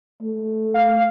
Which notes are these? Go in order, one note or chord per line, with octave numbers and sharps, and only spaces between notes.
A3
F5